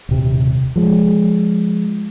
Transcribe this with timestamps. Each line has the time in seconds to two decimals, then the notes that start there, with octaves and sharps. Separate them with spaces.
0.09 D#1 C3
0.76 F3 G#3